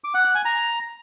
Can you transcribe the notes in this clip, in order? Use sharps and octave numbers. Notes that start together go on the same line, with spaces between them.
D6
F#5
F#6
G#5
A#5